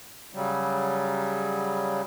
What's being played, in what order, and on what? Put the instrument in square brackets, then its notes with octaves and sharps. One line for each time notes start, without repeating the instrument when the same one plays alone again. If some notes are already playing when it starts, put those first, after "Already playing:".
[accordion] C#3 F#3 G3